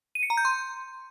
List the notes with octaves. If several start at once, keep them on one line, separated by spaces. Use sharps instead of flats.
D#7
C#7
A#5
G6
C6